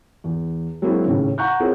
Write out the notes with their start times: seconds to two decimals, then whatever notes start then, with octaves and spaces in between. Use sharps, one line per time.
0.24 E2
0.82 F#3 G#3 A#3 C4 E4 F#4
1.06 D#2 A2 C#3
1.38 F#5 A#5 C#6 F#6 G6
1.60 C4 E4 F4 G#4 A#4 C#5